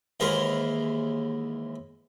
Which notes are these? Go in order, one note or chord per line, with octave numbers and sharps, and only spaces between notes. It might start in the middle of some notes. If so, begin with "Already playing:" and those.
D#2 G#2 E3 A#4 A#5 C6